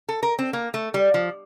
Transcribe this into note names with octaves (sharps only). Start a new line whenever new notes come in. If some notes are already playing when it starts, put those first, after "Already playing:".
A4
A#4
C4
A#3
A3
G3
F3